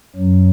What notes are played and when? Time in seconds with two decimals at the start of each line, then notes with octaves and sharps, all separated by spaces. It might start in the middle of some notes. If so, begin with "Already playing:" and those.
0.16 F#2 F#3